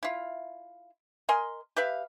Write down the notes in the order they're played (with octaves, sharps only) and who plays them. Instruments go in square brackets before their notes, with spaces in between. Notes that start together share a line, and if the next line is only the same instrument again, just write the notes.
[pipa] E4 F4
A#4 D#5 G#5 C6
G4 B4 E5 F5